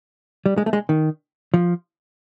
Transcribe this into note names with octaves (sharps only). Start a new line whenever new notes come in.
G3
G#3
A3
G#3
D#3
F3